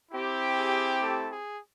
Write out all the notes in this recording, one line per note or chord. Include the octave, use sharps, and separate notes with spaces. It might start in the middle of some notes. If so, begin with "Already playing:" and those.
C4 E4 G4
G#4
A3 A4
G#4